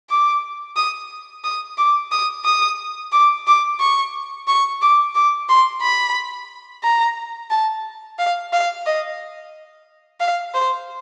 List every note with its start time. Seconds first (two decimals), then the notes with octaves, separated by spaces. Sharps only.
0.10 D6
0.76 D#6
1.44 D#6
1.78 D6
2.11 D#6
2.45 D#6
3.12 D6
3.47 D6
3.80 C#6
4.47 C#6
4.82 D6
5.15 D6
5.49 C6
5.82 B5
6.83 A#5
7.50 A5
8.18 F5
8.53 F5
8.86 D#5
10.20 F5
10.54 C5